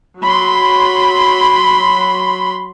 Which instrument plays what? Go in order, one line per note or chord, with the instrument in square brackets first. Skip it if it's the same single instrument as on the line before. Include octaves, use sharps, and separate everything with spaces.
[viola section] F#3 B5 C6